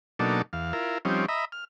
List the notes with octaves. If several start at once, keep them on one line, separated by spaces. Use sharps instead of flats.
B2 F#3 A#3 D4 D#4 A4
E2 F5
E4 F4 A#4
F3 G3 C4 C#4 D#4
D#5 E5 A#5 B5
F6